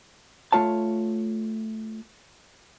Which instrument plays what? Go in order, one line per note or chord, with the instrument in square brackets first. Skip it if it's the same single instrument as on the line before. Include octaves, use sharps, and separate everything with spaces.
[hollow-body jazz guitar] A3 F4 C#5 A5